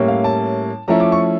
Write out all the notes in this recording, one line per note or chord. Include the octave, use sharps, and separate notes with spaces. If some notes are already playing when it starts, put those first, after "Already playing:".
Already playing: A2 G3 A#3 C#4 E4
F5
A5
F3 A3 C#4 E4 A#5
D6
C#6